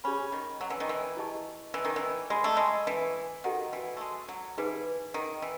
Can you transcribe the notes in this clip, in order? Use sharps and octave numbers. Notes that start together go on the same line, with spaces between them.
C#4 G#4 C#5 G#5 B5
D#3
F#3
E3
D#3
E3
E4 G#4 D#5 A5 C#6
E3
D#3
E3
G#3 G#4 D#5 G#5 B5
A3
G#3
E3
D#3 F#4 A4 D#5 F#5
E3
A3
G#3
F#3
E3 D#4 G#4 B4
D#3
E3